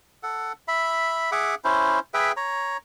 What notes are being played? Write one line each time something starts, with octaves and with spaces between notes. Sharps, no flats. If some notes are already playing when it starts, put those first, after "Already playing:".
A4 F#5
E5 B5
G#4 E5 F#5 D6
C#4 E4 C5
G#4 B4 E5 G5
C#5 A#5